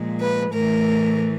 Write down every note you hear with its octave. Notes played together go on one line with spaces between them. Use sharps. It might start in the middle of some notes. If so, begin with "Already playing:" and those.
Already playing: A#2 F3 G#3
B4
A2 E3 A3 A#4